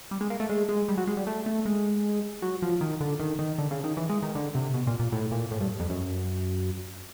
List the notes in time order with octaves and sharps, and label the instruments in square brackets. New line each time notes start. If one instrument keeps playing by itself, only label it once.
[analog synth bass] G3
G#3
A#3
A3
G#3
G#3
G3
F#3
G#3
G3
A3
A3
G#3
F#3
F3
D#3
D3
D#3
D#3
D3
C#3
D#3
E3
G#3
D#3
D3
C3
B2
A#2
A#2
A2
A#2
A2
G2
F2
F#2